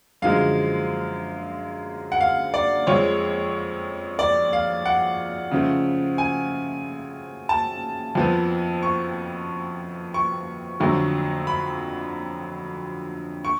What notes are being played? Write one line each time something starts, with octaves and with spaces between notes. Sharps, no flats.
F#2 D3 F3 G#3 F5
F#5
F5
D5
F2 F3 G#3 C#5
D5
F5
F#5
C#3 F3 A3
G#5
A5
F2 F3 B3
C#6
C#6
F2 D3 F#3 A3
B5
C#6